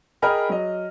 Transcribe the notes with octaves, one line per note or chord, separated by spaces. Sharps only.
G#4 A#4 D#5 G5 B5 F6
F#3 D#5